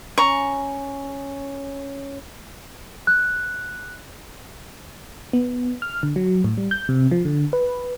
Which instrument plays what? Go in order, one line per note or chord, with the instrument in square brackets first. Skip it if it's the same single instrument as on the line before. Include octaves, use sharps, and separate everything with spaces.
[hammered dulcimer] C#4 [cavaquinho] A#5 C#6
[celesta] F#6
[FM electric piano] B3
F6
D3
F#3
A2
G3
G6
C3
F3
D3
B4